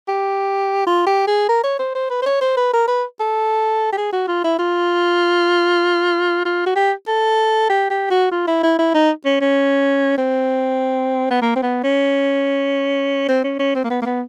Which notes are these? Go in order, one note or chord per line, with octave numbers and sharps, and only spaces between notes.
G4
F4
G4
G#4
A#4
C#5
C5
C5
B4
C5
C#5
C5
B4
A#4
B4
A4
G4
G#4
F#4
F4
E4
F4
F4
F#4
G4
A4
G4
G4
F#4
F4
E4
E4
E4
D#4
C#4
C#4
C4
B3
A#3
C4
B3
C#4
C4
C#4
C#4
C4
A#3
B3
A#3
B3